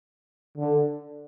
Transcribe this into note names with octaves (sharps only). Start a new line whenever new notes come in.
D3